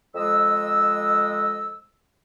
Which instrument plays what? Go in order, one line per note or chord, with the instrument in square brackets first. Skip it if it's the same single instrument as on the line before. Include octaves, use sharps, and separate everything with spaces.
[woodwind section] F2 G#3 D#5 E6